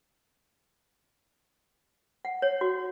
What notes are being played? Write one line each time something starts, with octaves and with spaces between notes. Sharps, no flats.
F#5
C#5
F#4